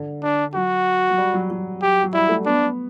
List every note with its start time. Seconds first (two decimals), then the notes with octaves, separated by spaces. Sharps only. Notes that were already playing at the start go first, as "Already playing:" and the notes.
Already playing: D3
0.23 D4
0.54 F#3 F#4
1.10 F#3
1.18 G3
1.34 F#3
1.50 F#3
1.82 G4
2.03 F#3
2.13 G3 E4
2.29 A3
2.46 B3 D4